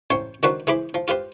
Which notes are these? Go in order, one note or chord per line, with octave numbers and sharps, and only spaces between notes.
A1 C5 C#5 G5
D#3 F#3 D4 F#4 B4 C5
E3 G#4 C5 B5 D6
F3
F4 G4 B4 C5